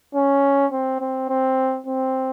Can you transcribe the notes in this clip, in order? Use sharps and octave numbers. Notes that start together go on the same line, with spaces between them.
C#4
C4
C4
C4
C4